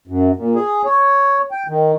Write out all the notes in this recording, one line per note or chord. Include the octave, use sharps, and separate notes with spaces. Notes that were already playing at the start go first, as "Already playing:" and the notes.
F#2
A#2
G#4
C#5
G5
D#3